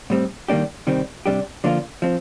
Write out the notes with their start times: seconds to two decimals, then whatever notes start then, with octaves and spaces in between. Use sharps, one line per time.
0.10 A2 G3 C4
0.48 D#3 G3 A#3 D4 G4
0.87 C3 D#3 G3 C4
1.26 C3 G3 D4 G4
1.64 D3 F3 A#3 D4 F4
2.02 F3 C4